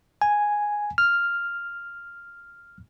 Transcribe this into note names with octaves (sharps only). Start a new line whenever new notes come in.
G#5
F6